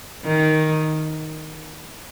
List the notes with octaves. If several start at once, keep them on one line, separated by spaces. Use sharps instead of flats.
D#3